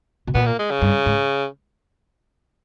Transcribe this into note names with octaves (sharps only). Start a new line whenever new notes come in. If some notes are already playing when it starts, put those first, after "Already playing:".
B2
A#2 B3
A#3
G#3
C#3
G2
G#2